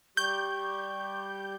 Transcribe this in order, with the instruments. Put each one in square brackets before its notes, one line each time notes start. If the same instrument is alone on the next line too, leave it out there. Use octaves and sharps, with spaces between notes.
[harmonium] G3 G4 [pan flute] C#6 [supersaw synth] G6